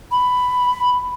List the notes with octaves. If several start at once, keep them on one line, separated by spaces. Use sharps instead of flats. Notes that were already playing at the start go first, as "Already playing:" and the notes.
B5